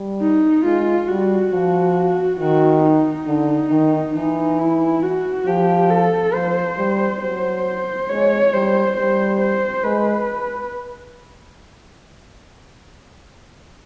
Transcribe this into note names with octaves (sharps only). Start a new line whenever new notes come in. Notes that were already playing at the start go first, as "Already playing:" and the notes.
Already playing: G3
D#4
G#3 F4
G3 F#4
F3
D#3 F#4
D#4
D3
D#3
E3 D#4
E4
F#4
F3 G4
A4
F3 C5
G3
F#3 C5
G#3 C#5
G3 C5
G3 C5
C5
G#3 B4